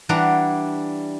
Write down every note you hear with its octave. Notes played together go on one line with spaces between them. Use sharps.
E3 G3 D4 F#5 A#5